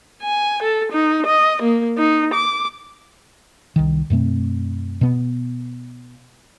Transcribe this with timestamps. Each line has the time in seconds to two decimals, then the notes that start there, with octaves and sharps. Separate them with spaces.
0.22 G#5
0.62 A4
0.92 D#4
1.26 D#5
1.62 A#3
1.97 D#4
2.34 D6
3.76 C2 D#3
4.10 F#2 B2 A3 C4
5.01 B2 B3